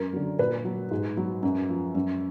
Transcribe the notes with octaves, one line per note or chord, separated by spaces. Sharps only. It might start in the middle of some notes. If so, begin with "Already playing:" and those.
Already playing: F#2 A#4
D3 F#3
A#2 B4
F#3
G#2
F#3
F#2
F3
F#2